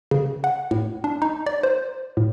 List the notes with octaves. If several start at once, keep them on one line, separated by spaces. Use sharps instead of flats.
C#3
F#5
A2
D4
D#4
D5
C5
A2